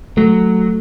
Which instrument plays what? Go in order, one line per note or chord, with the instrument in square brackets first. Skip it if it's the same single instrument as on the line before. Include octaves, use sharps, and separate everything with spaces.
[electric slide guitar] F#3 [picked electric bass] A3